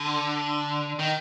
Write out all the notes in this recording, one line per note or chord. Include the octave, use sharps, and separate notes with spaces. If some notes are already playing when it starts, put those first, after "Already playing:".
Already playing: D3
D#3